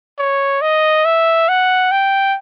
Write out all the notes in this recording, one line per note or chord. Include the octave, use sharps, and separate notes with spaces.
C#5
D#5
E5
F#5
G5